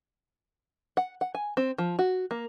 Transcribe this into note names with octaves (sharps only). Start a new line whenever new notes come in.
F#5
F#5
G#5
C4
F3
F#4
A#3